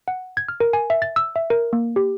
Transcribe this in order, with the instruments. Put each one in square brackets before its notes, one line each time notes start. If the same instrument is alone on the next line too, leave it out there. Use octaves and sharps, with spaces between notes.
[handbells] F#5
G#6
F6
A#4
G#5
E5
A6
E6
E5
A#4
A#3
G4